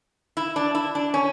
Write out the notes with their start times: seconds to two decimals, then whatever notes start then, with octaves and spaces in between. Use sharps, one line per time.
0.37 E4
0.56 D4
0.75 E4
0.95 D4
1.14 C#4